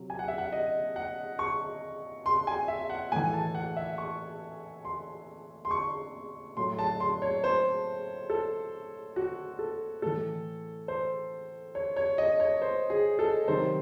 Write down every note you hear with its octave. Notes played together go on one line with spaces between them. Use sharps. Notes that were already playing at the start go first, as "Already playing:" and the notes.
Already playing: C3 F#3
G#5
F#5
E5
F#5
D#5
F#5
C#6
C6
G#5
E5
F#5
A2 E3 G#5
A5
F#5
E5
C#6
C6
C6
C#6
A2 F#3 C6
A5
C6
C#5
C5
A4
F#4
A4
A2 E3 A4
C5
C#5
C#5
D#5
C#5
C5
G#4
A4
C3 D#3 F#3 C5